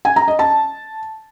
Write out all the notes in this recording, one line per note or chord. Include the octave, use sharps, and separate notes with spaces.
G#5
A#5
D#5
A5